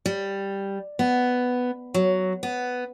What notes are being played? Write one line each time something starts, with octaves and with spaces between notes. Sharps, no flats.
G3
B3
F#3
B3